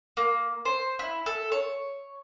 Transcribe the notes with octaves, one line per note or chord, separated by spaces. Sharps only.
A#3
C5
E4
A4
C#5